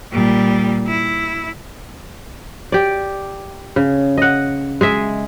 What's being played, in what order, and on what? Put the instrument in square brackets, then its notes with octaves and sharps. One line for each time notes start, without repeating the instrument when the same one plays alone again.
[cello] A#2 G3
E4
[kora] G4 D5
C#3
D#5 F#5
G#3 G#4 E5